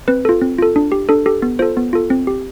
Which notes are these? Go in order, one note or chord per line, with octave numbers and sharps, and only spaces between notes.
C4 B4
F4 A4
C4
F4 A4
D4
G4
D4 A4
G4 A4
B3
F4 A4 C5
B3
F4 A4
C4
G4